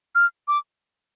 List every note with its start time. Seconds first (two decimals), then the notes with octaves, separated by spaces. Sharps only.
0.15 F6
0.48 D6